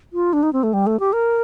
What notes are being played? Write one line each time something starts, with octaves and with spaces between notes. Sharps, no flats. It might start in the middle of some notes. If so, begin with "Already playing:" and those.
F4
D4
D#4
C4
A3
G3
A3
G4
A#4